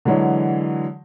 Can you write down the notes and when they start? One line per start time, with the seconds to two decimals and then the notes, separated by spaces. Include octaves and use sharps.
0.05 D3 E3 F#3 G#3